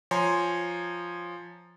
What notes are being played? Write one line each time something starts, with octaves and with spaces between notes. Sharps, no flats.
F3 C#5 G#5 A#5 C6